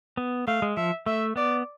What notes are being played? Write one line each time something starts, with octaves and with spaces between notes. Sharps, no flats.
B3
A3 F5
G#3
F3 E5
A3 E5
B3 D5